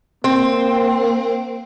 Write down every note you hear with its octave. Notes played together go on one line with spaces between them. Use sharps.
A#3 C4